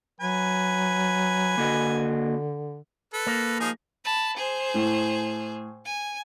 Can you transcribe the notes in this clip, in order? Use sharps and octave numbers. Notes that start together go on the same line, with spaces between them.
F#3 B4 G#5
D3 A#3 F#4 D#5
A4 B4
A#3
F3 D#4 G#4
A5 B5
G#4 C5
A2
G#5